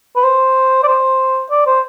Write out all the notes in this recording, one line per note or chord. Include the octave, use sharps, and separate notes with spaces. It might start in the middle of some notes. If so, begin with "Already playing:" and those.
B4
C5
D5
C5
D5
C5